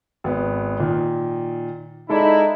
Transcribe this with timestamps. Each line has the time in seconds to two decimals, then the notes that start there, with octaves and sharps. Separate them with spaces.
0.24 G#1 B3
0.79 A#2 D#3
2.10 G#3 D#4 E4 A4 D5